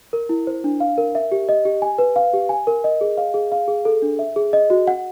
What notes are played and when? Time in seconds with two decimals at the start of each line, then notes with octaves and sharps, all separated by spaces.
0.13 A#4
0.29 E4
0.47 C5
0.64 D4
0.80 F5
0.98 A#4
1.15 E5
1.32 G4
1.49 D#5
1.65 G4
1.82 G#5
1.98 B4
2.16 F5
2.33 G4
2.49 G#5
2.67 A#4
2.84 D#5
3.01 G#4
3.17 F5
3.34 G#4
3.52 F5
3.68 G#4
3.85 A4
4.02 D4
4.19 E5
4.36 G#4
4.53 D#5
4.70 F#4
4.87 F#5